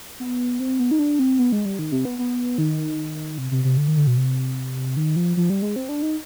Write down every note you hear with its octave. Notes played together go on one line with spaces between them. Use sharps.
B3
C4
B3
D#4
D4
C4
B3
G#3
G3
D#3
C3
B3
B3
D#3
C3
C3
C3
D3
D#3
D3
B2
C3
D#3
F3
F3
G3
G#3
C4
D4
D#4